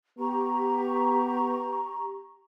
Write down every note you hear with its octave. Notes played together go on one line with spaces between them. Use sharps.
B3 G4 A#5 C#6